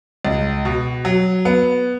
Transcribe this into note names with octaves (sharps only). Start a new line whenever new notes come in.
C#2
B2
F#3
B3